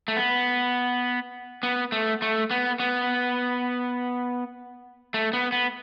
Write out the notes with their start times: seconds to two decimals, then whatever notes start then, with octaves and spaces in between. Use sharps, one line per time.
0.08 A3
0.16 B3
1.63 B3
1.92 A3
2.22 A3
2.51 B3
2.80 B3
5.14 A3
5.33 B3
5.52 B3